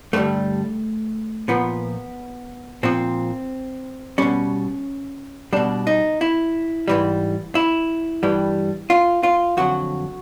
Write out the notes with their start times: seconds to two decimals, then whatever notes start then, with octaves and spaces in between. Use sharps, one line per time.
0.13 G2 D3 G3 A3
1.48 A#2 F3 B3
2.83 A#2 F3 C4
4.18 B2 G3 C#4
5.53 B2 G3 D4
5.87 D#4
6.21 E4
6.88 G#2 E3 G3
7.55 E4
8.23 G2 E3 G3
8.90 F4
9.23 F4
9.57 F2 D3 F#3 F#4